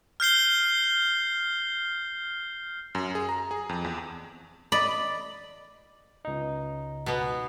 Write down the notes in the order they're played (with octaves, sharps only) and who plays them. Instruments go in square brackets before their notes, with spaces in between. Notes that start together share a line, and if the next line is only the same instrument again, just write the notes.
[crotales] F6 G6 C7 G7
[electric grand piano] F#2
G#4
A#5
G#4
F2
E2
[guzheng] D5 D#5 B5
[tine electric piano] C#2 D#4
[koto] B2 B3